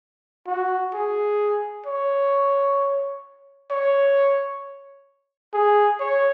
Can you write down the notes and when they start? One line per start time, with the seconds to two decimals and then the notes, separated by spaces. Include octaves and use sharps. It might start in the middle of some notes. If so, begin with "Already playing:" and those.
0.47 F#4
0.94 G#4
1.86 C#5
3.71 C#5
5.54 G#4
6.00 C#5